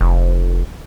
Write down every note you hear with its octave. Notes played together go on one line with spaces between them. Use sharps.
F1